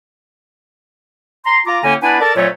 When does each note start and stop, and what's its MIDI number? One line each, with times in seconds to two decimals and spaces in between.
1.45 1.60 82
1.45 1.60 84
1.66 1.79 65
1.66 1.79 82
1.66 1.79 86
1.83 1.95 45
1.83 1.95 50
1.83 1.95 58
1.83 1.95 61
1.83 1.95 79
1.83 1.95 80
2.02 2.17 59
2.02 2.17 62
2.02 2.17 64
2.02 2.17 71
2.02 2.17 74
2.02 2.17 80
2.21 2.33 69
2.21 2.33 70
2.21 2.33 74
2.21 2.33 81
2.36 2.48 41
2.36 2.48 46
2.36 2.48 54
2.36 2.48 57
2.36 2.48 61
2.36 2.48 73